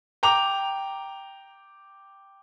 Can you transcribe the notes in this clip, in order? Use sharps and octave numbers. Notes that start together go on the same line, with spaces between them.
G5 A#5 D6 F7